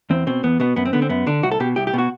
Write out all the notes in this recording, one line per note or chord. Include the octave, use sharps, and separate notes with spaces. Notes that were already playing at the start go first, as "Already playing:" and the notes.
E2 C4
B2 C4
E2 B3
B2 B3
F#2 B3
C4
D3 B3
C4
F#2 B3
D3 D4
C2 F#4
A4
B2 G4
C2 G4
G4
B2 F#4